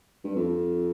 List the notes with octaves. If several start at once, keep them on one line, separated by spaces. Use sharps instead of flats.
G2
F2